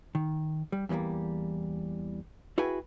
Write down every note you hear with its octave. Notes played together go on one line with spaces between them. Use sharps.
D#3
G3
E2 E3 F3 G3 A#3
E4 F#4 G#4 B4 G5 G#5